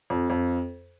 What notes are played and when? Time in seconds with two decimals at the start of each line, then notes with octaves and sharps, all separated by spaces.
0.10 F2
0.30 F2